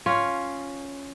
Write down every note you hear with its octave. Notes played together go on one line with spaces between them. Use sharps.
C#4 F4